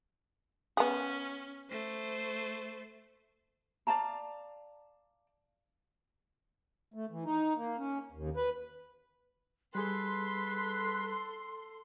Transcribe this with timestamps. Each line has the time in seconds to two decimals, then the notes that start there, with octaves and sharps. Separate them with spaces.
0.77 B3 C#4 G#4
1.70 A3 C5
3.87 D5 F5 A5 A#5
6.94 A3
7.11 E3
7.24 D#4
7.57 A#3
7.78 C#4
8.12 D#2
8.36 B4
9.75 G3 G#4 A4 B4 C6